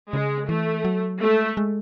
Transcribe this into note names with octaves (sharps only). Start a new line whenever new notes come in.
C#3 G#3
E3 A3
F#3
G#3 A3
G#3